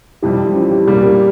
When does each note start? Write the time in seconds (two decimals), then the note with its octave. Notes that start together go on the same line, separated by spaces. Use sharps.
0.23 F2 E3 G3 C4 E4 G4
0.55 C#4 F4
0.71 E4 G4
0.87 A#2 G3 A#3 F4 G#4
1.03 G4 A#4